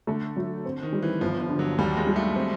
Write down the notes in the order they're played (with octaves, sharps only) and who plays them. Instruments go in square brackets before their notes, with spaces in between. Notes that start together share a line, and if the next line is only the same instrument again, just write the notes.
[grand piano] D3 [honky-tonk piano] A3
[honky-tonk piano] F#3
C4
[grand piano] D#3
[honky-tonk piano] G3
[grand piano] E3
[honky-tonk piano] G1 [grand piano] F3
[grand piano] F3
[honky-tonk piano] D3
[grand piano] F#3
[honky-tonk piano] D#2 [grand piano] G3
[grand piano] G#3
[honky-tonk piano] G3
[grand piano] A3
[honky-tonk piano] C4